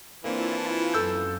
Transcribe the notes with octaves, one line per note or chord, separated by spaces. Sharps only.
E3 A#3 C4 D4 E4 F4 A5
F#2 A4 E6 G6